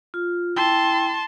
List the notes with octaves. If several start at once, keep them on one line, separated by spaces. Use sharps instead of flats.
F4
E4 G5 A5 C6